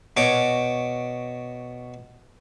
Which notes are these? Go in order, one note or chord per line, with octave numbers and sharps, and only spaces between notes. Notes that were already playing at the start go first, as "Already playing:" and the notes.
B2 C#5 D6